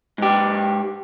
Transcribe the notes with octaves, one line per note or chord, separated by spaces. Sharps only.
G#2 G4